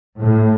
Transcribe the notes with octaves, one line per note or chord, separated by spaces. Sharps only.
A2